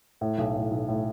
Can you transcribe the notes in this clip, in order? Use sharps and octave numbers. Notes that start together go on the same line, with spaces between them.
A2
B1
A2
B1
A2